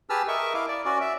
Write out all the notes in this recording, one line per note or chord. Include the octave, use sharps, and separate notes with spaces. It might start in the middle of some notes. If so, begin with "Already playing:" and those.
G4 G#4 B4 A5 E6 F6
A#4 D#5 E5 C#6
E4 F5 D6
D5
C#4 F#4 D5
E5